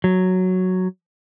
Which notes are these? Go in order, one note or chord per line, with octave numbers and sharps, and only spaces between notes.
F#3